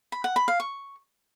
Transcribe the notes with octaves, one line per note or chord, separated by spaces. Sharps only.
B5
F#5
B5
F5
C#6